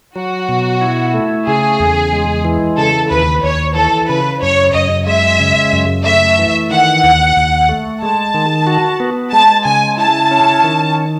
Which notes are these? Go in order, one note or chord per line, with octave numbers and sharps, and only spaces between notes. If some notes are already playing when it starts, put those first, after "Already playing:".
F#3 F#4
B2
E4
A3
C#3 G#4
E2
G#3
E3
C#3 A4
D#2 B4
D#2 C#5
E3 A4
C#3 B4
F#2 C#5
F#2 D#5
G#3 E5
C#3
F#2
A3 E5
E3
D#3 F#5
D#2
D#2
A3
G#3 A5
D#3
F#4
B3
G#3 A5
C#3 G#5
E4 A5
C#4
D#3